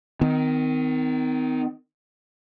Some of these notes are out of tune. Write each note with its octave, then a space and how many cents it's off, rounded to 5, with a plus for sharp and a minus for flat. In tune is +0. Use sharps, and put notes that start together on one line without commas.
D#3 +0 C4 -45